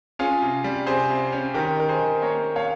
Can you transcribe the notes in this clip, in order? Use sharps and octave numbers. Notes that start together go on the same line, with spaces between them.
C#4 F4 G#4
C3
G3
C3 G#4 C5
C3
C#4
D#3 G4 A#4
D#4 A#4
G#4 C5
D#3
A#3 A#4 C#5
A#3
C#5 F5